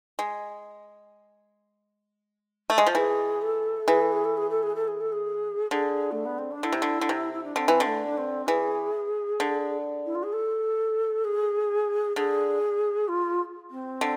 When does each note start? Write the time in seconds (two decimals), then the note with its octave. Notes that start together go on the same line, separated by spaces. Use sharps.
0.19 G#3
2.70 A3
2.78 G#3
2.86 F3
2.95 E3 G#4
3.42 A4
3.87 E3 G#4
4.00 A4
4.12 G#4
4.24 A4
4.37 G#4
4.50 A4
4.63 G#4
4.75 A4
4.88 G#4
5.00 A4
5.12 G#4
5.71 D3 G#4
6.12 A3
6.25 B3
6.38 C4
6.51 D4
6.63 D3 E4
6.72 C3
6.82 D3
7.01 D3
7.09 C3
7.33 E4
7.44 D4
7.56 D3 C4
7.68 E3
7.80 D3
7.86 A3
8.06 D4
8.18 C4
8.47 E3 G#4
9.40 D3
10.06 E4
10.15 F4
10.23 G#4
10.33 A4
11.24 G#4
12.16 D3 G#4
13.08 F4
13.71 C4
14.01 D3